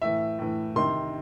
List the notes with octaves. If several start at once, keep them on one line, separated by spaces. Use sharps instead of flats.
A2 E3 E5
A2 E3
C3 D#3 C6